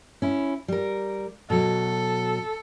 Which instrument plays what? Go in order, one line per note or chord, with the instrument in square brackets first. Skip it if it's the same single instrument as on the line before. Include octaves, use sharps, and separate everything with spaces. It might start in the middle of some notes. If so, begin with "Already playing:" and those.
[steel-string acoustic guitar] C#4 E4
G3 A#4
[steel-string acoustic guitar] B2 F#3 [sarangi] A4